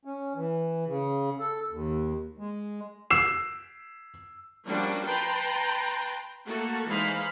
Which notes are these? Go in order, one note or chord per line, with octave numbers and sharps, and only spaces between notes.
C#4
E3
C#3
A4
D#2
G#3
E6 C7 E7
F3 G3 A#3 C#4 D4 F#4
B4 G5 A5 A#5 C6
A3 A#3 F#4 A4
E3 G#3 D#4 C5 F5 B5